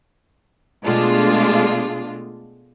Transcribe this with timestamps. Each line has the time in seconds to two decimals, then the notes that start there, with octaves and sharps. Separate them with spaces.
0.84 B2 G#3 A3 D4 F4